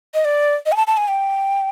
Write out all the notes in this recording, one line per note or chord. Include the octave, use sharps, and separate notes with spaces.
D#5
D5
D#5
G#5
A5
A5
G#5
G5